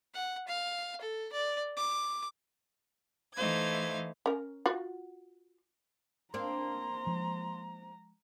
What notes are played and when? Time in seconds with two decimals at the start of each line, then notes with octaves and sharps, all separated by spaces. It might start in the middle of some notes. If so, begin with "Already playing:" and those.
0.14 F#5
0.48 F5
1.01 A4
1.33 D5
1.77 D6
3.35 E3 A3 D#4 C5 F5 G#6
4.26 C#4 A#4
4.66 F4 F#4
6.34 A#3 C4 D4 A#5 C6
7.07 F3 G#3